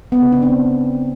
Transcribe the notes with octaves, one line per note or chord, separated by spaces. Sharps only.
B3
C#3
D4
C4